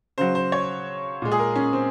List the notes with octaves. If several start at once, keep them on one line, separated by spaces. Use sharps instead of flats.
C#3 F#3 C5
C5
C#5
A#2 G#3
G#4
A#4
C#4
C4